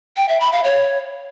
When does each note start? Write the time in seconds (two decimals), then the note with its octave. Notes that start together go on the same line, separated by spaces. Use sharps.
0.17 G5
0.29 E5
0.41 B5
0.52 F5
0.64 C#5